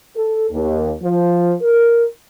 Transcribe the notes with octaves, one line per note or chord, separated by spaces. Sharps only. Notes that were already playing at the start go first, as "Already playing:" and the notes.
A4
D#2
F3
A#4